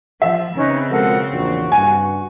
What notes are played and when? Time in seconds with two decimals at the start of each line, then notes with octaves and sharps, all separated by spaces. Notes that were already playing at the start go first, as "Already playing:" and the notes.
0.22 F3 E5
0.56 C#3 C4 C#4 D#4 B4
0.90 B2 F3 G#3 A4 A#4 F#5
1.33 A#1 E2 F#4
1.72 G2 G#5